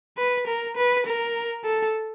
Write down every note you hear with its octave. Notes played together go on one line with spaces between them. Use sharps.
B4
A#4
B4
A#4
A4